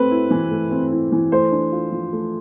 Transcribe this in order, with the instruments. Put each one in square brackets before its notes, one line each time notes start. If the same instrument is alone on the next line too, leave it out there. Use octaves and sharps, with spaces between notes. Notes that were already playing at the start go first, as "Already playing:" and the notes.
Already playing: [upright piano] A3 C4 [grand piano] B4
[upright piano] E4
E3
A3
C4
E4
E3
[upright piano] A3 [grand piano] C5
[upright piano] D4
F4
F3
A3